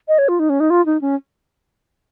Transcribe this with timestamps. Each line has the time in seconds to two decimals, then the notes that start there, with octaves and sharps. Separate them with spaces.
0.08 D#5
0.18 C#5
0.28 F4
0.39 D#4
0.49 C#4
0.60 D#4
0.70 F4
0.86 D#4
1.01 C#4